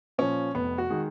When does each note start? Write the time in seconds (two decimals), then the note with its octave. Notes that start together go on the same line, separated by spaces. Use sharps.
0.18 A#2 F3 C#4
0.55 F1 B3
0.78 F#4
0.90 D#3 G#3